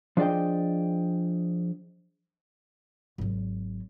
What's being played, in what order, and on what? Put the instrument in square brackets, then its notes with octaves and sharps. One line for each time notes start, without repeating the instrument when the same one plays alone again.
[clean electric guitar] F3 D4 G#4 D5 D#5 G5
[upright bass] G#1 F#3